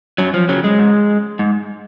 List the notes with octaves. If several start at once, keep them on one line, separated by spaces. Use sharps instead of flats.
F#2 F#3
F3
C#3 F#3
G#3
G#2
G#2